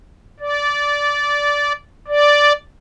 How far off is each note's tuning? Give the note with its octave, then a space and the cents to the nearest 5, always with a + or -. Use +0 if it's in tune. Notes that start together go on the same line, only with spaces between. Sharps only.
D5 -15
D5 -5